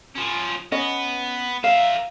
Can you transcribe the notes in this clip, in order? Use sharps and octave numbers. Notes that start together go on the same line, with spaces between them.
F3 C#4
B3 C#4 D#5
A#4 E5 F5